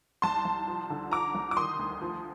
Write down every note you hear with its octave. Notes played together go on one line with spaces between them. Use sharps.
C2 A5 C6
C2
F3
D3
F3 A#5 D6
C2
D6
D#3 C6 D#6
D2
F3